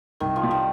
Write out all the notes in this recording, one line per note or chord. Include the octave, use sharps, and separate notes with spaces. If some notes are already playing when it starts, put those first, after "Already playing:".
C2 D#3
F3
G3
D#3